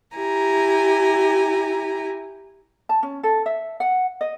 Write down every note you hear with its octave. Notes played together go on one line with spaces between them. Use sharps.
E4 G4 G#5 A#5
A5
C#4
A4
E5
F#5
D#5